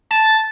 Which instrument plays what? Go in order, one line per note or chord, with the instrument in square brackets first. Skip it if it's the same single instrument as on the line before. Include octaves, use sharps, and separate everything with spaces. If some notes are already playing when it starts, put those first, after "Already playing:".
[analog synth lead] A5